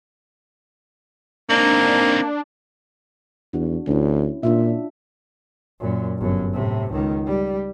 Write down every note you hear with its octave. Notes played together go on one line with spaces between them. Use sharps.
A#3 C4 D4 D#4
E2 D4 F#4
D2 C#4 E4
A#2 D4 F4 E5
F#2 A#2
G1 F#2
A2 C3
C#2 D#3
G3